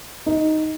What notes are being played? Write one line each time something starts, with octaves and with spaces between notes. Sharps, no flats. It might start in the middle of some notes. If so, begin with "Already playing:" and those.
D#4